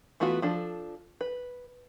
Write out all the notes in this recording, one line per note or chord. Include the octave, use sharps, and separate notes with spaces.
E3 A3 B3 F4 F#4
F3 D4 A4
B4